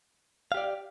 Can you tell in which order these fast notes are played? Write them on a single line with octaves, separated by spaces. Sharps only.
F5 G4 D5